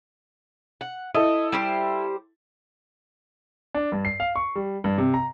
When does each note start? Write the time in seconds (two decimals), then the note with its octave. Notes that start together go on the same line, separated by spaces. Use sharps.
0.81 F#5
1.14 E4 A4 D#5
1.52 G3 G4 C5
3.75 D4
3.92 G2
4.05 C7
4.20 F5
4.36 C#6
4.56 G3
4.84 G2
4.98 C3
5.14 A#5